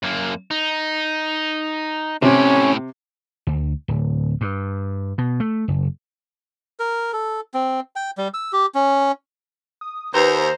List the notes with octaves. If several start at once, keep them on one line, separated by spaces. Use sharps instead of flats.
F#2 A#3
D#4
A2 C3 C#4 G4
D2
D1
G2
B2
A3
F#1
A#4
A4
C4
G5
G3
E6
G4
C#4
D#6
D#2 B4 C5 A#5